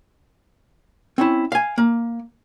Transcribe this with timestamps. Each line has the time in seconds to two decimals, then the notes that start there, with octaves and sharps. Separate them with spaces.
1.18 C4 C#4 E4
1.52 F5 G#5
1.78 A#3